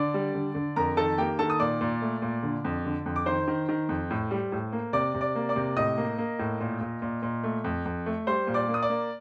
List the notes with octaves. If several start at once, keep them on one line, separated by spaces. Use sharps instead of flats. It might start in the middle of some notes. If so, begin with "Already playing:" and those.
Already playing: D3 D5 D6
G3
D3
D3
F2 A#4 A#5
D#3 A4 A5
A#3 G4 G5
D#3 A4 A5
D#6
A#2 D5 D6
A#2
A3
A#2
D3
F2
D3
F2
D6
D#3 C5 C6
D#3
D#3
F2
A2
G3
A2
A#3
C3 D5 D6
C3
D5 D6
A#3
D5 D6
C3
A2 D#5 D#6
A#3
A#3
A2
A#2
A#2
A#2
A#2
A3
F2
F2
A3
G3 C5 C6
A#2
D5 D6
A#3
D#6
D5 D6
A#3